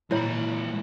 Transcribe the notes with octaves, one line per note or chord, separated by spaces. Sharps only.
A#2 E3 F#3 G#3 E4 C#5 A#5 B5